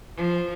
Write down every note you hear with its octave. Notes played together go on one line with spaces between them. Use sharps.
F3